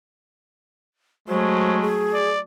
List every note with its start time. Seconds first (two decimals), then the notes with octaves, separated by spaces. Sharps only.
1.28 F#3 G#3 A3 C5
1.81 G#4
2.14 D5